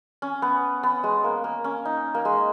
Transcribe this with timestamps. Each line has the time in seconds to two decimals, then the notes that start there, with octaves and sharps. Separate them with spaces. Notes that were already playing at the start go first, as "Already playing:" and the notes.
0.22 C#4
0.42 B3
0.83 B3
1.04 G#3
1.24 A#3
1.44 A#3
1.64 C#4
1.85 D#4
2.15 A#3
2.25 G#3